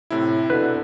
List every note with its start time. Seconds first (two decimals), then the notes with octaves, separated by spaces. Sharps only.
0.10 A2 C3 E4
0.50 B2 D3 B4